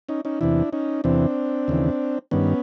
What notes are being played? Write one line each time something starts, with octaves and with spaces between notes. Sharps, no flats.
C#4 D#4
C#4 D#4
E2 C3 E3 D4 E4
C#4 D#4
E2 C3 E3 C4 D4
D#2 C#3 E3
G2 D#3 B3 C#4